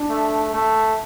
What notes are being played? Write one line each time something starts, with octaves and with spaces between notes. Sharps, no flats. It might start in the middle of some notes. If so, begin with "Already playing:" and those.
Already playing: D4
A3
A3